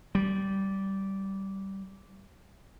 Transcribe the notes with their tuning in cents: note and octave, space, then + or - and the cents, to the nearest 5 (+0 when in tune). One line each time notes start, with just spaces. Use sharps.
G3 -15